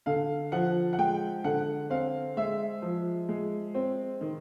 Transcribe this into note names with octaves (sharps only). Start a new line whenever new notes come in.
D3 F5
F3 F#5
F#5
G#3 G5
D3 F#5
C4 F5
G#3 E5
F3
G#3
C4
D#3